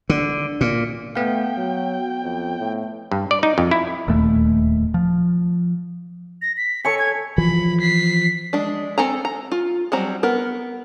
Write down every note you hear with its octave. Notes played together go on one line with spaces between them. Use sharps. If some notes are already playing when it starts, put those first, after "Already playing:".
D3
A#2
A3 B3 F5 G5
F#3
F2
A2
G2
D5
D#4
F2
E4
D1 D#2 A#2 A3
F3
A#6
B6
A4 C#5 G#5 C#7
G#6
E3 F3 B5
B6 C7
G#3 D4
C4 A4 G#5 A#5
A#5
F4
F#3 G3 C4 A#5
B3 A#4